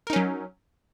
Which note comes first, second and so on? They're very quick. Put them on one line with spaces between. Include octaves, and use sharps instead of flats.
A#4 D#4 C#4 F#3